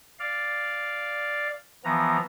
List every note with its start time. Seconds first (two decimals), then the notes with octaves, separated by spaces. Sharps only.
0.19 D5 F5
1.84 E3 F3 B3 A#5